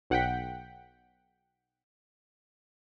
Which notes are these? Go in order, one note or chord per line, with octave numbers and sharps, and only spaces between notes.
B1 F#5 G5 B6